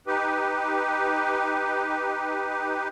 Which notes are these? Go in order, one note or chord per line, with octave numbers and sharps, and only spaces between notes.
D#4 G4 B4